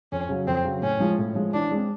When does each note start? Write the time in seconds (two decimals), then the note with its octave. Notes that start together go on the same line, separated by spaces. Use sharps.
0.12 F2 C#4
0.29 C#3 F#3
0.47 F2 C4
0.65 C#3 F#3
0.83 A2 C#4
1.00 F3 G#3
1.18 A2
1.35 F3 G#3
1.54 E3 D4
1.71 G#3 C4